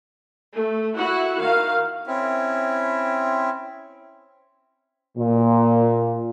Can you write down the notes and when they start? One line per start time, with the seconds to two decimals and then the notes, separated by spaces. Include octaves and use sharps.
0.54 A3
0.96 E4 F#4 F#5
1.41 D#3 F5
2.07 C4 C#4 E4
5.17 A#2